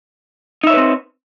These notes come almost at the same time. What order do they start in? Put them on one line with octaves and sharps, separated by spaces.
D#4 E5 C#5 B4 C4